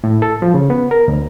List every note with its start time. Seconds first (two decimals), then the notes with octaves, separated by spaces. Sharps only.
0.04 A2
0.22 A4
0.42 F3
0.54 C#3
0.70 B3
0.91 A#4
1.08 D2